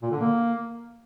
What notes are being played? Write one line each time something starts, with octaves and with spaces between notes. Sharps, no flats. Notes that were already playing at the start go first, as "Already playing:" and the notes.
A#2
D3
A#3